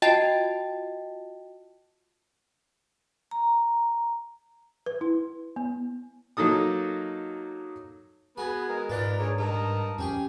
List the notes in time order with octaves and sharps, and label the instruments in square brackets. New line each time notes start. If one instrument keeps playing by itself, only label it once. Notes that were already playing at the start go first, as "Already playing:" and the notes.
[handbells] F4 F#4 D#5 G5 A5 A6
[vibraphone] A#5
[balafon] B4
E4
B3
[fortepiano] F#3 A#3 D#4 A4 D#6
[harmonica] B3 B4 [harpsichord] F#4 G#5 [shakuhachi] G#4
[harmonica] G#3 A#4
[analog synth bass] G#2 [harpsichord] F4 B4 [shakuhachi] D5
[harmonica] D4 A#4 C#5 [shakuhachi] G#4
[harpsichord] G2 [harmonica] A#4 D#5 [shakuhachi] A5
[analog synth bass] F2 [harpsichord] C#4 G#4 G#5 [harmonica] G4